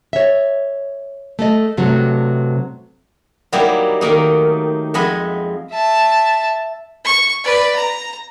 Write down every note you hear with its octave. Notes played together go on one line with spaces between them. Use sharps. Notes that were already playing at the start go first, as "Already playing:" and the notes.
C#5 E5
A3 A4 D#5
G2 C3 F#3 A3
F#3 G3 A#3 D#4 E4 G4
D#3 A3 A#3 D#4
F2 G#3 D#5 E5 F#5 B5
E5 A5
C#6
B4 D5
A#5